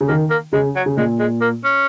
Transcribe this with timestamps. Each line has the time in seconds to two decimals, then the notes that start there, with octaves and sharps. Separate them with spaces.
0.01 C#3
0.08 D#3 A#3
0.30 A#3
0.53 C#3 G#3
0.76 F#3
0.86 C#3
0.97 A#2 G#3
1.19 G#3
1.41 A#3
1.64 C#4